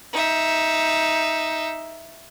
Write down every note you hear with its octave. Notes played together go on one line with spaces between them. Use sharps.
D#4 E5